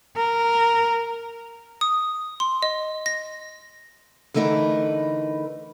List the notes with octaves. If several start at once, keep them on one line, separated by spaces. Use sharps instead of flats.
A#4
D#6
C6
D#5
A#6
D3 E3 A3 D#4 A#4 B4